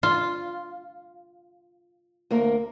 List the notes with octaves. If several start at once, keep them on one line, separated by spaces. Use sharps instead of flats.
F4
D2 A#3 A#4